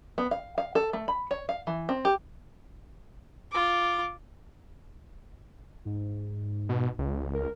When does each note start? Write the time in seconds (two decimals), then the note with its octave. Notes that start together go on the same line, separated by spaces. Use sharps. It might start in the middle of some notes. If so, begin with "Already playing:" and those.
0.18 B3
0.31 F5
0.58 F5
0.75 A4
0.93 A3
1.08 B5
1.31 C#5
1.49 F5
1.67 E3
1.89 C4
2.05 G4
3.51 F4 D6
5.85 G#2
6.69 B2
6.99 C#2
7.34 A#4